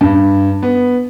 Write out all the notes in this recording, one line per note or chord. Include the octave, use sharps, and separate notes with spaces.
G2
B3